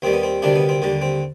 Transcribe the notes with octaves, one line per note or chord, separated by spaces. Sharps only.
D#2 D#3 G3 C4
B3
C4
D2 C3 D#3 G3 D4
B3
C4
D#2 D3 G3
C4